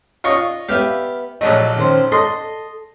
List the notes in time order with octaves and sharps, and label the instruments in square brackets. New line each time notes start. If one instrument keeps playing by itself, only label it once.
[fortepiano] F4 D#5 C#6
[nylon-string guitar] B3 B4 E5 [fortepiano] G4 F5
[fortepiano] A#1 F#3 A3 [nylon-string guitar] D#5
[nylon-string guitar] D#3 C#4 C5
[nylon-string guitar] A4 [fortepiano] D#5 C6